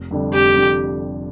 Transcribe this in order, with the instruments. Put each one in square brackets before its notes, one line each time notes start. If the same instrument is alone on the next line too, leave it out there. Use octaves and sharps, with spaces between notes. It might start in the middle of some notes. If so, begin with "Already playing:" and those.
Already playing: [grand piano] F1
F2 D3 G3
[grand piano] F1 [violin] G4
[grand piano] F2 D3 G3